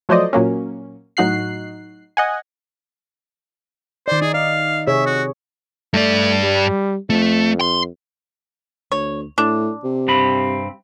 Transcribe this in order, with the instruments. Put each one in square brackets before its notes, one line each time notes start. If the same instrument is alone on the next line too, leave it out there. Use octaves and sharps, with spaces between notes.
[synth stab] F3 F#3 A3 C5 D5 D#5
A#2 F#3 A#3 C#4
A2 F#3 D#4 F#4 F#6 C7
D#5 F#5 G#5
[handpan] D#3 D5 [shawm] C5
[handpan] D#4 [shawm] G#4
[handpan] D#5 [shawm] F5
[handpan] C3 G#4 C#5 [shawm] E5
[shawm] F#4
[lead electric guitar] G2 D5 [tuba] A3
[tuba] G3
[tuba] F2 [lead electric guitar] A3
[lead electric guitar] C6
[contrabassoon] D2 [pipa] C#5
[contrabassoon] A2 [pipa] D4
[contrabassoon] C3
[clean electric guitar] G2 C4 B5